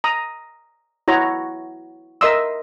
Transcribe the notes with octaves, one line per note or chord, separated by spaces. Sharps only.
A#5 D#6
E4 F#4 C#5 A#5
A#4 D#5 E5 C6 D#6 E6